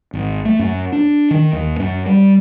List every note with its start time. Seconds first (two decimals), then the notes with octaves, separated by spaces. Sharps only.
0.13 G#1
0.45 A3
0.59 F#2
0.92 D4
1.31 D#3
1.53 D#2
1.79 F#2
2.06 G3